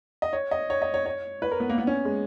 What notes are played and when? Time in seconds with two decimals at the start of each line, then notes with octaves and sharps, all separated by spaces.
0.22 D#5
0.33 C#5
0.51 D#5
0.70 C#5
0.82 D#5
0.94 C#5
1.06 C#5
1.42 B4
1.51 A#4
1.60 B3
1.70 A#3
1.78 B3
1.87 C#4
2.05 G#3